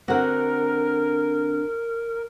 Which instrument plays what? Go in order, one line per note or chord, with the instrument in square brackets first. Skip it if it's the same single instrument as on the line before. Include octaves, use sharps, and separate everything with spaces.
[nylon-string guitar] D3 C4 [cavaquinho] F#4 F#5 [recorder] A#4